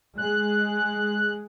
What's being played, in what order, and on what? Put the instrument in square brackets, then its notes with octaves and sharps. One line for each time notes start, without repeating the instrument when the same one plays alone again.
[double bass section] G#3 [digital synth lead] F#6